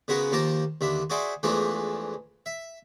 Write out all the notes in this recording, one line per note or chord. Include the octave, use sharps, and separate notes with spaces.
C#3 G#3 B3 F#4 A#4 B4
D#2 F3 A#3 A#4 A5 A#5
D#2 D3 E5
F#4 G#4 C5 D5 E5
E2 E3 F3 G#3 A3 D4
E5